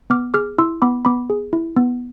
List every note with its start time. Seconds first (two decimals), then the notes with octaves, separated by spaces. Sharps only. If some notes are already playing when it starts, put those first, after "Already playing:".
0.10 B3 D6 F6
0.34 G#4 D6 F6
0.58 E4 C6 E6
0.82 B3 B5 D6
1.05 B3 B5 D6
1.30 G#4
1.53 E4
1.77 B3